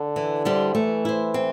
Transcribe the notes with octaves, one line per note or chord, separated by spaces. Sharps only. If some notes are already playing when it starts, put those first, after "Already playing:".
Already playing: D3
E3
G3 E4 G4 C5
E3 A3
E4 C5
C4